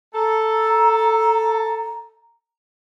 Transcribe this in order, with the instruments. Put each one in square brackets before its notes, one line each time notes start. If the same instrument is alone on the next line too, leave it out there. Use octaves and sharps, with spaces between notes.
[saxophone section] A4 [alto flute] A#5